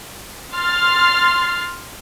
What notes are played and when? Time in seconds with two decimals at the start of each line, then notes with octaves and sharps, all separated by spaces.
0.54 C6 F6 A6 C7